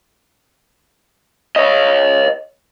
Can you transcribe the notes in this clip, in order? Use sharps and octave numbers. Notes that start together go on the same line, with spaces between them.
C#5 D#5